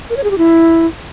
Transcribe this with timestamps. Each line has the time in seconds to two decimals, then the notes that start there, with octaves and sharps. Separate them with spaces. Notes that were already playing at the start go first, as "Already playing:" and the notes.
0.10 A#4
0.17 C#5
0.24 G#4
0.31 G4
0.38 E4